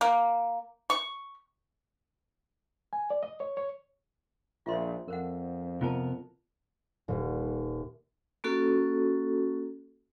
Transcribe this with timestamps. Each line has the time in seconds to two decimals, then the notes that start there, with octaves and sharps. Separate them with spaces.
0.01 A#3
0.90 C#6
2.93 G#5
3.10 D5
3.23 D#5
3.40 C#5
3.57 C#5
4.66 A#1 F4 E5 C6
5.08 F2 A#4 C5 F#5
5.81 C3 B3 F4 A#4 A5
7.08 D#1
8.44 A#3 C#4 F#4 A4